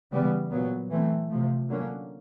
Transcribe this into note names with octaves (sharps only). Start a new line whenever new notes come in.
C#3 E3 G3 B3
A#2 F#3 B3
E3 A3 C4
C3 F3 A3
D3 F#3 A#3 C#4